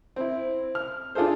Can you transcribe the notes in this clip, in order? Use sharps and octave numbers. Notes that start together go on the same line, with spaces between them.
C4 E4
F6
D4 F4 G#4 A4 C5